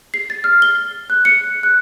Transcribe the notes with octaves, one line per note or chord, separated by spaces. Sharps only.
C7
A6
F6
G7
F#6
C#7
F#6